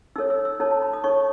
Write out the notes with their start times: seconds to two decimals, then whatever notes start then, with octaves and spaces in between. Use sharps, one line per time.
0.16 D#4 A4 C#5 E6
0.30 E6
0.45 E6
0.60 D#4 A4 C#5 A5
0.71 A5
0.82 B5
0.93 D#6
1.04 D#4 A4 C#5 C#6